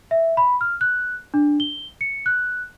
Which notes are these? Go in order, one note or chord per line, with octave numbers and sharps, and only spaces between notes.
E5
B5
F6
F#6
D4
G7
C#7
F#6